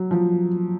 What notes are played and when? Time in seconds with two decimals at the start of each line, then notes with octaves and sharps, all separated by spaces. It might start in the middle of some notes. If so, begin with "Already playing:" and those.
Already playing: F#3
0.11 F3